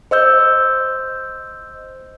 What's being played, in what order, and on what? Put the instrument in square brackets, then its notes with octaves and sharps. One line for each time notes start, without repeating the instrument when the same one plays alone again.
[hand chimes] C5 D#5 E6 G6